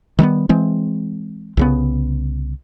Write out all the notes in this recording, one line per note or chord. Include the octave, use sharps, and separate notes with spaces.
D#3 G3 A3 B3
E3 G#3 C4
C2 C#3 B3